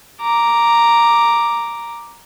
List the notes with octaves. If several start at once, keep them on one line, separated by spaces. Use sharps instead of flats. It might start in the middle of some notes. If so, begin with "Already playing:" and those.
A#5 D6